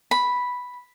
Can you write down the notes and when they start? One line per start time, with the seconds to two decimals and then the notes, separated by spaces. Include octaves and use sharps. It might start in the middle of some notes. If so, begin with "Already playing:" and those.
0.11 B5